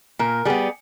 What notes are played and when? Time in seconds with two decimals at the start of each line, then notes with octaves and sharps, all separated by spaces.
0.19 A#2 A#4
0.45 G3 B3 G#4